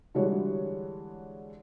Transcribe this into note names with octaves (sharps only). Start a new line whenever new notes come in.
D3 E3 G3 G#3 F#4 C#5